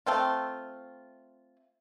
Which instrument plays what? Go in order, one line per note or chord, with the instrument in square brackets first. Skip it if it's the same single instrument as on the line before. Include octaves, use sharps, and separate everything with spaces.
[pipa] A3 C4 F4